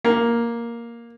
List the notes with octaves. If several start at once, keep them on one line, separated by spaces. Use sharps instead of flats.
A#3